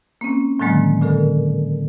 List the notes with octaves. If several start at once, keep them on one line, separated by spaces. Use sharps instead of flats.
A#3 C4 C#4
A2 D3 D#3 F#3 G#3 A#3
A#2 D3 A4 A#4